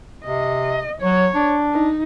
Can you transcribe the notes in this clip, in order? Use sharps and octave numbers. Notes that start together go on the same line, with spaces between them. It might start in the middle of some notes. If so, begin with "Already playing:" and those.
C3 D#5
F#3 C#5
D4
D#4